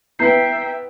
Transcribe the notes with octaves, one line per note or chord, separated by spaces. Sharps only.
B3 E4 E5 G5 A#5 G6 C7